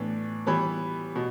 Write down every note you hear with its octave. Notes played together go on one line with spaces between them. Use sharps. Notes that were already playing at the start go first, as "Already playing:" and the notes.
Already playing: A2 E3 B3 D4
E3 G3 B3 B5
B2